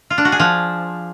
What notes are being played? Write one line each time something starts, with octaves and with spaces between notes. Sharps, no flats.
F4
D4
F#4
G#4
F3